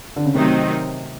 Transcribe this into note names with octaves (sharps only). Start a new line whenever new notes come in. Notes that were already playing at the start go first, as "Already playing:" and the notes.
D3
C#3
C3 D#3 F#3 A3 C4 D#4